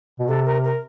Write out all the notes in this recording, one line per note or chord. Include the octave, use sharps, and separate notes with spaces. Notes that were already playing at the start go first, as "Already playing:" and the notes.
B2
C3 A4
A#4
A#4